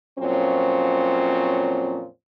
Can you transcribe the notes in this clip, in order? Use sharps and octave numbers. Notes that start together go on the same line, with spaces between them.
F2 A#2 F3 F#3 C4 C#4